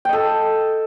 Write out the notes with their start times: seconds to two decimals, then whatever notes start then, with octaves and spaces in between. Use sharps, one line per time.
0.05 G5
0.09 D#5
0.13 A4